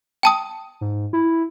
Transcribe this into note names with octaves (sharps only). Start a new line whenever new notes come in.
G5 A5 D#6
G#2
E4